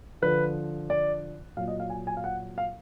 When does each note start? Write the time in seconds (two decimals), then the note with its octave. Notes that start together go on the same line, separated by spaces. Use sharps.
0.22 D3 F3 B4
0.90 D5
1.57 A#2 F#3 F5
1.68 D#5
1.80 F5
1.90 G#5
2.07 G#5
2.17 F5
2.24 F#5
2.58 F5